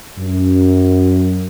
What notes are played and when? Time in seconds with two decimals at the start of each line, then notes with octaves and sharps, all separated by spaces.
0.19 F#2